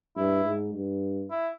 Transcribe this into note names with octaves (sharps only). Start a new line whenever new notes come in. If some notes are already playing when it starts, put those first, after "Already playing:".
G2 E4
G#2
G2
E4